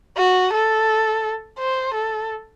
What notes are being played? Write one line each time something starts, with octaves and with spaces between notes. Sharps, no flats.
F#4
A4
C5
A4